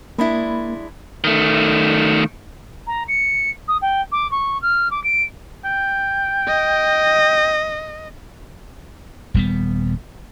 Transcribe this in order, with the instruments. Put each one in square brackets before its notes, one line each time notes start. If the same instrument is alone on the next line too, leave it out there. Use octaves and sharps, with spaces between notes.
[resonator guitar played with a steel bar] G#3 D4 E4 [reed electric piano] A#3 B5
[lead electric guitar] D#3 A3
[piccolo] A#5
C#7
D#6
G5
D6
C#6
F6
D6
D7
[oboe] G5
[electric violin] D#5
[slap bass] D#1 G3 B3